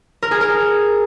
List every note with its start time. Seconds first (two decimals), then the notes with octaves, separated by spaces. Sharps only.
0.22 A#4
0.31 G#4
0.41 A#4